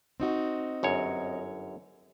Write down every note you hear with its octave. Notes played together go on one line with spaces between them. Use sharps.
C4 D#4 F#4
G1 F#2 C#5